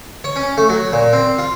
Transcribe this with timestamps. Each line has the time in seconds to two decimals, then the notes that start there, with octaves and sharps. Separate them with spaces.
0.24 C#5
0.36 C#4
0.58 A3
0.69 F#3
0.93 A#2
1.13 C4
1.39 F4